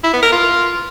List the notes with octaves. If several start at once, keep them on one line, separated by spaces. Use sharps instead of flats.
E4
B3
A#4
F4